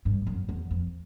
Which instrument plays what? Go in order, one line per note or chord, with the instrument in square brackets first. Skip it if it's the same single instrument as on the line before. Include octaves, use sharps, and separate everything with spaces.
[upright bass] G2
F#2
E2
F2